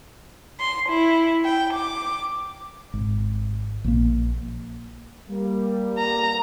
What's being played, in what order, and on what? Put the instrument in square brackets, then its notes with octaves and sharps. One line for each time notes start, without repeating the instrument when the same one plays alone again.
[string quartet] C6
E4
G5
D6
[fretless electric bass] G#1
A#1 A#3
[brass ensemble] G3 A#3
[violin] A#5